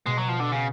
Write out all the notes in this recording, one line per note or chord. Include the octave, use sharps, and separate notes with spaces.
B2 G#3
F#3
F3
D3
C#3